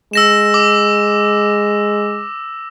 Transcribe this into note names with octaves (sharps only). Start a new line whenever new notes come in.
G#3 E6 A#6 E7
D6